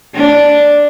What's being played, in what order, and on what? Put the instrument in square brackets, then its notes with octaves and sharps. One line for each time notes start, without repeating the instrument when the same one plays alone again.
[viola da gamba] D4